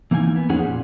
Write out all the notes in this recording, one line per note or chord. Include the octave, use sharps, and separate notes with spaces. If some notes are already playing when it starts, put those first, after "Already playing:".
E3 A#3 D#4 F#5 G#5
B3
F2 C#4 D#4 G#4 F#5
A#2